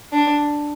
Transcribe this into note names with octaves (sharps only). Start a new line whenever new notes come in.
D4